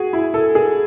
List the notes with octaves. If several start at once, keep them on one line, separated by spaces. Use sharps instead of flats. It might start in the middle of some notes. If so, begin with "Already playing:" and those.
Already playing: F#4 G#4
E4
A4
G#4